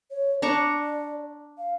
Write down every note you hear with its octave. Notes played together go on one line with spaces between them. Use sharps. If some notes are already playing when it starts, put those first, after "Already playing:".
C#5
D4 D5 A#5 C#6
F5